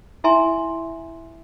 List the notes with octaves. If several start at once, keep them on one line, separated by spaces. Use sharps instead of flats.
E4 E5 G#5 A#5 C6